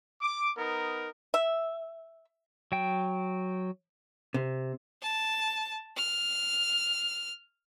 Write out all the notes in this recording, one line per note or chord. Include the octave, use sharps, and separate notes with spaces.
D6
B3 D#4 A#4
E5
F#3 G5
C3
A5
F6